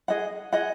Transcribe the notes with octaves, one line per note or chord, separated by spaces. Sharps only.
G#4 D#5 F#5
G#4 D#5 F#5